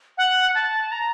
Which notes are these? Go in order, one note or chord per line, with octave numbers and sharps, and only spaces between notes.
F#5
A5
A#5